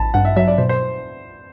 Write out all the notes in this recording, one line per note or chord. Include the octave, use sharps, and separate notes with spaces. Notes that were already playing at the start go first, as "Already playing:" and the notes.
Already playing: A1 A5 B5
G2 F#5
E5
F#3 E5
D5
B2 C5
C5